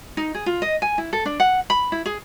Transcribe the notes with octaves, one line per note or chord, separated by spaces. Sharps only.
D#4
G#4
F4
D#5
G#5
E4
A4
D4
F#5
B5
E4
G#4